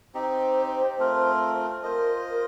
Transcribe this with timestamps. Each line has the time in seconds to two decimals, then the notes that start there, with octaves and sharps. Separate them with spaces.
0.14 C4 D#4 G4 C5
0.99 A3 C4 F4 A#4
1.83 F4 A#4 C5 D#5
2.25 A#4